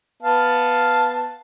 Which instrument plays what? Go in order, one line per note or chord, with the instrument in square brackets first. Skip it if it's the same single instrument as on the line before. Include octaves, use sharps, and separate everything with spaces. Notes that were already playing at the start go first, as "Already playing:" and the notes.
[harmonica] B3 F5 A5